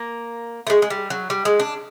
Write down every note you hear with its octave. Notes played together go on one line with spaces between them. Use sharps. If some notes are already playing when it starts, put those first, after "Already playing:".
Already playing: A#3
A3
G#3
G#3
G3
F#3
G3
G#3
D4